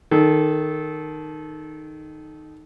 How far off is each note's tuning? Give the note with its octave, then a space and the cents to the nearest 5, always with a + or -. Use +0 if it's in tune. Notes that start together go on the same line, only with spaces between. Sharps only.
D#3 -5 A4 -20